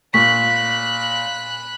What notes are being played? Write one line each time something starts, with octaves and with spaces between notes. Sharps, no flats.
A#2 B5 C#6 F#6 B6